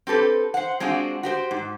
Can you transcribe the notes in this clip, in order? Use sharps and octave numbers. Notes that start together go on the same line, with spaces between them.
C4 G4 A4 B4
C5 F#5
G#3 C4 D4 F4 F#4
F#4 G4 C5
G#2